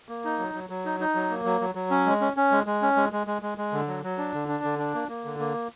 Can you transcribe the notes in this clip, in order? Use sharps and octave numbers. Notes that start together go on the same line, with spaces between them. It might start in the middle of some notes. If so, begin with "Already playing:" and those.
A#3
D#4
F#3
F#3
F#3
D#4
D#4
F#3
A#3
F#3
F#3
F#3
C#4
G#3
C#4
C#4
G#3
G#3
C#4
G#3
G#3
G#3
G#3
G#3
D3
F#3
F#3
D4
D3
D4
D3
D4
A#3
A#3
D3
A#3